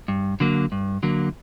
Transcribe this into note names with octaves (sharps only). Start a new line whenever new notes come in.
G2
D3 F#3 A#3
G2
D3 F#3 A#3